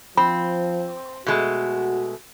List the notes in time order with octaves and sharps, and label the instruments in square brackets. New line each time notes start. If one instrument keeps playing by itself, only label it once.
[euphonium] F3 [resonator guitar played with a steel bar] C4 [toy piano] B5
[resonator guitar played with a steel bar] B2 G#3 A3 [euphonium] F#4